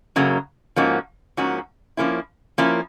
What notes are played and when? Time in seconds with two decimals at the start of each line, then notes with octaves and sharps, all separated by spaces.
0.16 F#2 C#3 F#3 A#3
0.76 G#2 F3 A#3 C#4 F#4
1.37 G#2 F3 A#3 C#4 F#4
1.97 F3 A#3 C#4 E4
2.58 F3 A#3 C#4 E4